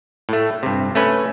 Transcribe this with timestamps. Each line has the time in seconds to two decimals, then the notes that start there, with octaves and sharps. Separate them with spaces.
0.29 A2 A3
0.63 G2 C3
0.95 A3 C#4 B4